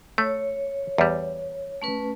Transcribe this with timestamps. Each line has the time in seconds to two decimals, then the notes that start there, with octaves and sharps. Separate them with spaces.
0.18 A3 C#5
0.98 E2 G3
1.82 A3 C#4 B4